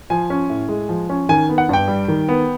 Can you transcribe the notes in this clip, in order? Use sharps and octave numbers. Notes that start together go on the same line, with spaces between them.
F3 G#5
C#4
A2
G#3
F3
C#4
D#3 G#5
B3
F#5
G2 G5
G3
D#3
B3